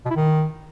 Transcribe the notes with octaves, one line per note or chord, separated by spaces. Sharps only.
B2
E4
D#3